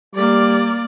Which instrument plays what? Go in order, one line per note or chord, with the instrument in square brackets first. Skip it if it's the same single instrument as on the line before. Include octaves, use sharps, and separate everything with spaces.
[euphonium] G3 [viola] A#3 D5